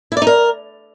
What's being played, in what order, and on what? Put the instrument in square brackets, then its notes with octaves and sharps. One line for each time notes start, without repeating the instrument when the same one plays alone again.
[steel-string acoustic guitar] E4
D5
D#4
A#4